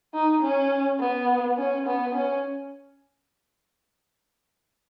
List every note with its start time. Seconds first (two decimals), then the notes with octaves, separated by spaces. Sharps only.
0.14 D#4
0.42 C#4
1.00 B3
1.58 C#4
1.87 B3
2.15 C#4